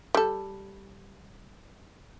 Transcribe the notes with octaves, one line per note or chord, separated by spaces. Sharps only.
G3 A4